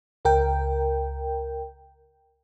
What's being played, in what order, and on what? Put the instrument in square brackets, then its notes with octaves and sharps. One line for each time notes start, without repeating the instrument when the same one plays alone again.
[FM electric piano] C#2 A#4 G5